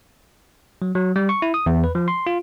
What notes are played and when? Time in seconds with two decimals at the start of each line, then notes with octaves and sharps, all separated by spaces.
0.82 F#3
0.95 F#3
1.16 G3
1.29 C#6
1.42 E4
1.54 D#6
1.66 E2
1.84 B4
1.95 F3
2.08 C6
2.27 F4